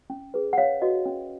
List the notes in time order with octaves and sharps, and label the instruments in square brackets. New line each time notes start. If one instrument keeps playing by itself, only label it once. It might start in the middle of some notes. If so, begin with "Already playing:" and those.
[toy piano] C#4
G#4 B4
F#5
C#4 C#5 F5
F#4 B4 D#5
C#4